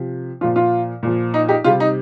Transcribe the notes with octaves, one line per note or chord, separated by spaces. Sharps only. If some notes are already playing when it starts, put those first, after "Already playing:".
Already playing: C3 F3
A#2 F3 F4
F4
A#2 F3
D#4
D#4 G4
C3 G3 F4
D#4